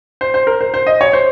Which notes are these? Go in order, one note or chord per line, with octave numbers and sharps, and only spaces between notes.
C5
C5
A#4
C5
C5
D#5
C#5
C5